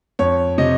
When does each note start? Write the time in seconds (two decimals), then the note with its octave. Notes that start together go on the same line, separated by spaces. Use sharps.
0.19 F2 C#5
0.58 C3 D#5